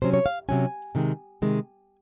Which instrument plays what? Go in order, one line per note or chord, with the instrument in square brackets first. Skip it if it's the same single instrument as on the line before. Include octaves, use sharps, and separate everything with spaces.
[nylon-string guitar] C3 F#3 C#4 C5
C#5
F5
C3 F#3 C#4 G#5
C3 D#3 G#3
C3 D#3 G#3